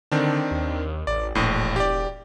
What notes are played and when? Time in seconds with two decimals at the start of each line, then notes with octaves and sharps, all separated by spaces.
0.12 D3 D#3 C4 D4
0.51 D#2
1.07 A1 D5
1.35 E1 A#1 A2
1.76 G4 D5